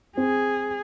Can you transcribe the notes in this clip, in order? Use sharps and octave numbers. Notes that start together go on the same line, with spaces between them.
C4 G#4